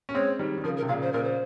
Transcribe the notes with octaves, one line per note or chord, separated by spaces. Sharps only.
C#4
G#3 C4 C#5
D#3 G3
D#3
C#3 F3 A#4
A#4
C3
A#2 C#3 F5
C5
A#2 C#3 A#4
C5